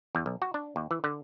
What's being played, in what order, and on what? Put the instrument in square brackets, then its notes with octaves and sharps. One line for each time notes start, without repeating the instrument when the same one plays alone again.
[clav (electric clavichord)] E2
B1
F#4
D4
D#2
E3
D3